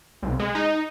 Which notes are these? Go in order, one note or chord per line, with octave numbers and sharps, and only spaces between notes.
C2
G#3
D#4